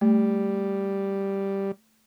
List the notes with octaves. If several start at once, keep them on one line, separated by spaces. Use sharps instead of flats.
G3 A3